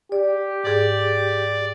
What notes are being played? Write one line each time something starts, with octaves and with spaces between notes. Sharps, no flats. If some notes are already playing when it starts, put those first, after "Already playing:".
G4 D5
G#2 G#4 D5